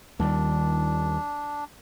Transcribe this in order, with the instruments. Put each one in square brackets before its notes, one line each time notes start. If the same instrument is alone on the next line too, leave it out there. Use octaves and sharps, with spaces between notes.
[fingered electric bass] D#2 G3 [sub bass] D#3 [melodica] D4